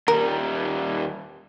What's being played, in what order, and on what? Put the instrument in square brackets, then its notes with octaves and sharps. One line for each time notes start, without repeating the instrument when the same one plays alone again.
[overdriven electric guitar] D#2 G3 [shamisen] A#4